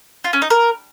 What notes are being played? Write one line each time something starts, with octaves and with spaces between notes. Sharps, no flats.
F4
C#4
D#4
A#4